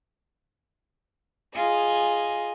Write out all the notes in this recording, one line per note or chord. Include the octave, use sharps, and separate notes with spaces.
F4 G#4 D#5 G#5